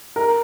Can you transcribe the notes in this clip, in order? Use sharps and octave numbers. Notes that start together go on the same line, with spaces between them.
A#4